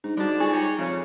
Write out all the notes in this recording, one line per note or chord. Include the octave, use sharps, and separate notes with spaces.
G#2 D4
G#2 D3 G3 D4 F#4
F4 G#4 C#6
D#4 G4 C#5
F2 C#3